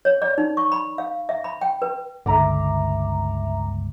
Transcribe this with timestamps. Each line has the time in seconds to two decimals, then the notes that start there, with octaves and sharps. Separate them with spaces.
0.05 C#5
0.22 D5
0.38 D#4
0.57 C#6
0.72 B5
0.98 F5
1.29 E5
1.44 B5
1.61 G5
1.82 B4
2.26 G1 C#2 D3 E5 A#5 D6